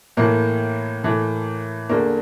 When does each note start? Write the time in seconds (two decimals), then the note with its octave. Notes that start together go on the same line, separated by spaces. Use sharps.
0.17 A2 E3 A3 A#3
1.03 A2 E3 A3
1.89 E2 D3 A3 A#3